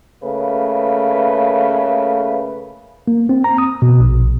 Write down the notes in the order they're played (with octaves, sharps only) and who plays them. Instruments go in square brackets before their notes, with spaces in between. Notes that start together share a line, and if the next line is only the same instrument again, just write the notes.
[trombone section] C#3 A3 A#3 B4
[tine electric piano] A#3
C4
A#5
D#6
B2
A#1